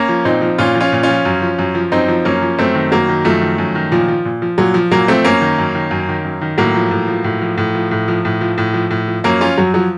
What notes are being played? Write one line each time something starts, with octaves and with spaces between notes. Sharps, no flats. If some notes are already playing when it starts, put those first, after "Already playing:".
Already playing: A#3 C#4
F3
A#2 C4 D#4
F3
A#2 C#4 F4
F3
C#4 F4
A#2
C#4 F4
F3
F#2
F3
F#2
F3
F#2 C4 D#4
F3
F#2 A#3 C#4
F3
F#2 A3 C4
D#3
F#2 F#3 A#3
D#3
F#2 F3 A3
D#3
F#2
D#3
A#2 F3
F3
A#2
F3
A#2 F#3
F3
A#2 F#3 A#3
F3 A3 C4
F#2 A#3 C#4
D#3
F#2
D#3
F#2
D#3
F#2
D#3
A2 F#3 A#3
F3
A2
F3
A2
F3
A2
F3
A2
F3
A2
F3
A2
F3
A2
F3
F#2 A#3 C#4
F3 C#4 F4
F#2 F#3
F3 F#3